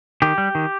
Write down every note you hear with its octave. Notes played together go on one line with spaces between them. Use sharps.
D#3 G4
G3
D#3